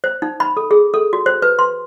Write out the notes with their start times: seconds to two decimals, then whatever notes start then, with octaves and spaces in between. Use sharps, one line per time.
0.04 C5
0.22 D#4
0.40 B5
0.57 A4
0.71 G#4
0.94 A4
1.13 F#4
1.26 C5
1.42 B4
1.59 C6